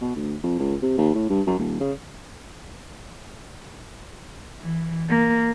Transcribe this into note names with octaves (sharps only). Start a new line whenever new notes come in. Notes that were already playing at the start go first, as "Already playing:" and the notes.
B2
D2
F2
C#2
C3
D#2
A2
G2
F#2
D#1
C#3
E3
A#3